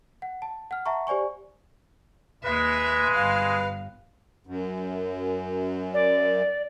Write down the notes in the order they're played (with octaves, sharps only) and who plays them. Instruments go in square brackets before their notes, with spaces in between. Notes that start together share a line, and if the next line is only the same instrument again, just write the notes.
[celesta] F#5
A5
F#5 F6
E5 F#5 A5 A#5 C#6
G4 C5 D5 G#5 C#6
[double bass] D#2 A#3 [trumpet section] G#3 [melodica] B4 [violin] E5
[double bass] G1 G3 [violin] F5
[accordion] F#2
[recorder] D5